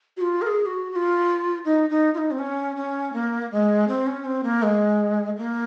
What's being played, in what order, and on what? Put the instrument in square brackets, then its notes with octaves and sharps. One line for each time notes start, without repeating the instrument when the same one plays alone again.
[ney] F#4
F4
A#4
G#4
F#4
F#4
F4
D#4
D#4
F4
D#4
C4
C#4
C#4
A#3
G#3
C4
C#4
C4
A#3
G#3
A#3